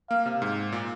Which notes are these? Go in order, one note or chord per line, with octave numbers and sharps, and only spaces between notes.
A#3 F5
C3
G#2
A#2